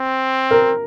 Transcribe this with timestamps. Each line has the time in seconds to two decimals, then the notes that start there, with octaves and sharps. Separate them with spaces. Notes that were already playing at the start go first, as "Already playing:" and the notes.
Already playing: C4
0.51 A#4